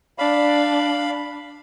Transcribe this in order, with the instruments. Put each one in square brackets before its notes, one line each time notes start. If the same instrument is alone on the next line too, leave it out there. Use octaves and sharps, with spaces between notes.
[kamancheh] D4 D5 [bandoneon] F5 B5